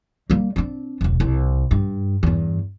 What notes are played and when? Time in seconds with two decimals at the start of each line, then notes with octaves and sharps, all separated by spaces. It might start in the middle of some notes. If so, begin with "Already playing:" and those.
0.30 G3 A#3
0.56 C4 D4
1.01 E1 C#2
1.20 C2
1.71 G2
2.23 E2 G2